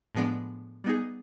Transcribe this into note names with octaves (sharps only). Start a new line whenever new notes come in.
A2 F3 G#3 B3 D4
G3 B3 D#4 G#4